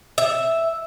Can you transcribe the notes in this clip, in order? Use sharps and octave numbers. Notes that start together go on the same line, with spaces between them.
E5